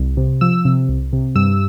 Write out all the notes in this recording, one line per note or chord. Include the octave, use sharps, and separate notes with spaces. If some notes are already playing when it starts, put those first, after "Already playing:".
Already playing: C2
C3
F3 E6
C3
C2
C3
G2 E6